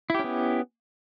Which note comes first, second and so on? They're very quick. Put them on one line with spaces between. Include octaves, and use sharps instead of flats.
E4 G4 C#4 B3